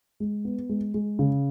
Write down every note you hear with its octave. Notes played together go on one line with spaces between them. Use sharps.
G#3
B3
G#3
G#3
C#3